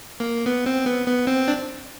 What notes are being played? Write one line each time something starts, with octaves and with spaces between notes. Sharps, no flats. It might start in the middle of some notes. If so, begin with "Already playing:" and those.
A#3
B3
C4
B3
B3
C4
D4